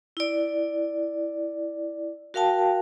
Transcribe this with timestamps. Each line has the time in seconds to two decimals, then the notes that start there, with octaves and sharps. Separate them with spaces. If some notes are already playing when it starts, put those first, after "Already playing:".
0.17 E4 D5
2.34 F#4 A#4 F5 G5 A5